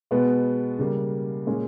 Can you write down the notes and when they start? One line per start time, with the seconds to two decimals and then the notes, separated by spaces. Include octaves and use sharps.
0.11 B2 G#3 B3
0.79 C#3 G3 A#3
1.46 A#2 G#3 C#4